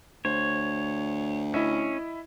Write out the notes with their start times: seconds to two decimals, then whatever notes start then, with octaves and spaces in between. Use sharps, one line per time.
0.25 D2 C5 C#5
1.54 C#4 E4 D#5 E5